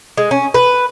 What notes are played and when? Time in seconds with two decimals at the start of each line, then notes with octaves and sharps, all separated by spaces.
0.17 G#3
0.31 C#4
0.54 B4